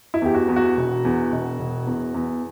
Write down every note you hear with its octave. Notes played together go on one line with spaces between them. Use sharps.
E4
E2 G4
F#4
E2
F#4
E1
E2
E1
E1
E2
E2